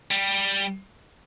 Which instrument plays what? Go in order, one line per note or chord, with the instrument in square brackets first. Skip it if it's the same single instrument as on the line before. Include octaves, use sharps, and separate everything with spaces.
[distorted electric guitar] G3